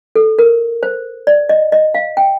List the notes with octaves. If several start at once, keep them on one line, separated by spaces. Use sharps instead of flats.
A4
A#4
C5
D5
D#5
D#5
F5
G5